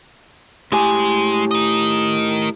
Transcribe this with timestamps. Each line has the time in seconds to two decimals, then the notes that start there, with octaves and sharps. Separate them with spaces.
0.72 A2 G#3 G4 G#5
1.51 A#4 D#5